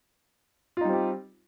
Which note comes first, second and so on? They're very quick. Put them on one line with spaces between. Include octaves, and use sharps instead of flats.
F4 D#4 G3 C4 G4